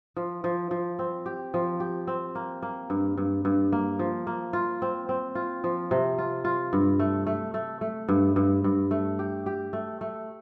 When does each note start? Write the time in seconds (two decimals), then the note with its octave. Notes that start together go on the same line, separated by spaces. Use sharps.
0.16 F3
0.44 F3
0.71 F3
0.99 C4
1.26 G4
1.54 F3
1.80 G4
2.07 C4
2.35 A#3
2.63 A#3
2.90 G2
3.18 G2
3.45 G2
3.72 A#3
3.99 F3
4.27 A#3
4.53 F4
4.82 C4
5.09 C4
5.35 F4
5.64 F3
5.91 C3
6.18 F4
6.45 F4
6.73 G2
7.00 A3
7.27 A3
7.54 A3
7.81 A3
8.09 G2
8.36 G2
8.64 G2
8.91 A3
9.19 G4
9.46 G4
9.73 A3
10.01 A3